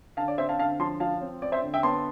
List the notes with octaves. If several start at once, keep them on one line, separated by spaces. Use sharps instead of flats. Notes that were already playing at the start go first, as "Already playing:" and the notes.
D3 F5 A5
D5
C4 C5 E5
F5 A5
D3 F5 A5
F3 A5 C6
F3 F5 A5
C4
C4 D5
C5 E5
D3
E5 G5
B3 A5 C6